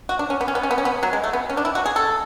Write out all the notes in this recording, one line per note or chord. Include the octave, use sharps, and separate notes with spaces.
F#4
D4
C#4
B3
C#4
B3
C#4
B3
C#4
B3
F#3
G#3
A3
B3
C#4
D4
E4
F#4
G#4
A4